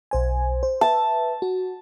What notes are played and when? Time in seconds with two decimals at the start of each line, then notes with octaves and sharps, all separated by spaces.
0.11 B1 C5 G#5
0.63 C5
0.81 B4 E5 A5
1.42 F#4